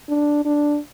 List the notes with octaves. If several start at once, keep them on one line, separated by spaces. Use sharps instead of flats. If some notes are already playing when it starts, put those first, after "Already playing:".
D4
D4